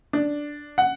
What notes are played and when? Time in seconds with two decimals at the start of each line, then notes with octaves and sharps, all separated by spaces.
0.13 D4
0.78 F#5